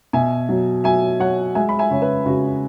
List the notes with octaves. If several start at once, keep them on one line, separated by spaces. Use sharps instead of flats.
B2 E5 G#5
F#3
F#3 E5 G#5
F#3 C#5 F#5
G#3 E5 G#5
B5
E5 G#5
C#3 C#5
B4 E5
C#3 F#4